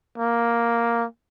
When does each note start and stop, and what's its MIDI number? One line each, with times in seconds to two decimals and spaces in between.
0.18 1.05 58